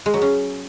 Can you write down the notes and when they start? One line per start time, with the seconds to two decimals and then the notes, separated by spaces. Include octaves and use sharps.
0.06 G#3
0.14 F#3
0.22 C#4